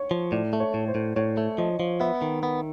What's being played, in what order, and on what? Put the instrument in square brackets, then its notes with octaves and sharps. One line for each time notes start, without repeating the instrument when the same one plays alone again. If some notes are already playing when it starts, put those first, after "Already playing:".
Already playing: [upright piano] C#5
[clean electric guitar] F3
[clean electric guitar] A2 [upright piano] D5
[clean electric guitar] A3
[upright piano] C#5
[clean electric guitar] A2
[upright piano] C5
[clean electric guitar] A2
[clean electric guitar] A2 [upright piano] C#5
[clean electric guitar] A3
[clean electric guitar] F3 [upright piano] D#5
[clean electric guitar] F3
[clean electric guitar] B3 [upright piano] E5
[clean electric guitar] D#3
B3